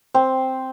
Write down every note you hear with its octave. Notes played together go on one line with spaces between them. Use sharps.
C4